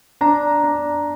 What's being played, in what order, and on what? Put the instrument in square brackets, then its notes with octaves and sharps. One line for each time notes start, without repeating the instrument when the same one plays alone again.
[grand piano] D4 [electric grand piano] A#5
[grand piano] D4